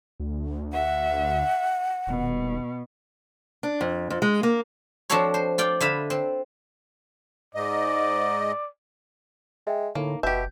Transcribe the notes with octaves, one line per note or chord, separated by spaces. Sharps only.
D2
E5 F#5
D#1 B2
D4
F2
F2
G#3
A#3
F3 C4 D4 F#4 A4 C#5
C5
F4 D5 G5
D3 F4 E5 B5
C4
G#2 D5 D#5
G#3 E5 G5
A2 D3 A#3 D#4
F#1 B2 G4 E5 G6 B6